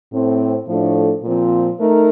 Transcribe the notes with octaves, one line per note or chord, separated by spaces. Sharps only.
A2 A3 C4
A2 F3 A3 D4 A4
A#2 F3 C4
A3 D#4 A#4